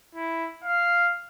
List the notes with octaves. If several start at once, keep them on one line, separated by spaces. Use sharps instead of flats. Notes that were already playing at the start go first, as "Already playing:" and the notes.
E4
F5